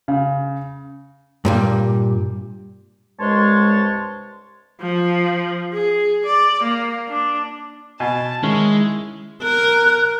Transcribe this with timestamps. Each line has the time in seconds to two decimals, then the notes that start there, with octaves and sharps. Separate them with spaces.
0.08 C#3
1.45 G2 A#2 G3
3.19 C2 G2 G#3 C#5 A5 C6
4.81 F3
5.73 G#4
6.26 D5
6.63 A#3
7.08 D4
8.00 B2 G#5 A5
8.43 D#3 G#3 C#4 E4
9.43 A#4 F#6